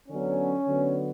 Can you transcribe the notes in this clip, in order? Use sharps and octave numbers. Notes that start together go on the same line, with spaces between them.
D3 F#3 B3 C#4
D3 F#3 B3